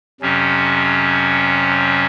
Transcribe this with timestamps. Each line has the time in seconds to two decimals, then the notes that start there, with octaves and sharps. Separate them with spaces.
0.21 F2 C3 F#3 C#4